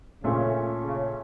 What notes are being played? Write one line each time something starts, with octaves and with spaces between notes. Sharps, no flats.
A#2 C#3 A3 C#4
C#3